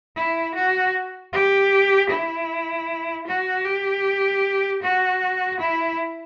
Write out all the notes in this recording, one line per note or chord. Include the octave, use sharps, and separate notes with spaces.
E4
F#4
G4
E4
F#4
G4
F#4
E4